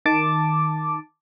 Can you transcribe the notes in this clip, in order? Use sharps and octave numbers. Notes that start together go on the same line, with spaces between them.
D#3 A5 D6